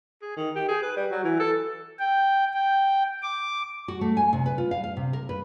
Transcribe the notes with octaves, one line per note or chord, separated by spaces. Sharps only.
G#4
D#3
G4
G#4
B4
G3
F#3
E3
A4
G5
G5
D6
F#4
A3
G#5
C3
B4
F4
F5
F5
C3
A#4
B4